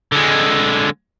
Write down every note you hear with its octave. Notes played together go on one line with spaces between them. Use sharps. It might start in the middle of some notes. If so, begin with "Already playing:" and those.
D3 G#3